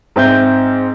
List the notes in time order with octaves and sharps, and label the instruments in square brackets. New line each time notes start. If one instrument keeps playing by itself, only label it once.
[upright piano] G#2 C4 E5 G6